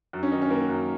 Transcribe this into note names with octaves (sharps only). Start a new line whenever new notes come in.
F#2
C#4
D#3 D#4
C#4
D#3 A#3
F#2